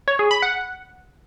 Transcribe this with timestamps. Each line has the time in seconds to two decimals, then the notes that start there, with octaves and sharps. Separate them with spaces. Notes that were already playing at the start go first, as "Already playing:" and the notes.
0.08 C#5
0.19 G#4
0.31 B5
0.42 F#5